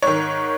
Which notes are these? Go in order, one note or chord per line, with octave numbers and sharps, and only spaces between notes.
G#2 D#3 C#5